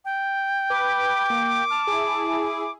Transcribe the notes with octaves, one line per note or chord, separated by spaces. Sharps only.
G5
B4 D6
A#3
A5 F6
E4 G#4